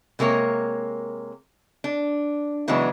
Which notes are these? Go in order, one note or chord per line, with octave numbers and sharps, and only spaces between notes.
C3 G#3 A#3 A#4 C#5
D4
C#3 E3 F#3 G#3 B3 D4